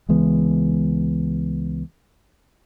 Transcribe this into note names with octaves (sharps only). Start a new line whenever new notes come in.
C#2 E3 G#3 B3